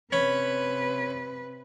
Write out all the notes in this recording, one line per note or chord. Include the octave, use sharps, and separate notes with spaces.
C3 C#4 B4 B5